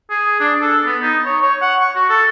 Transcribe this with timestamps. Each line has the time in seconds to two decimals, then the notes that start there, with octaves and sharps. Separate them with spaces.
0.10 G#4
0.40 D4
0.61 A4
0.85 B3
1.02 D#4
1.25 C#5
1.41 C#5
1.61 F#5
1.81 C#6
1.95 F#4
2.09 A4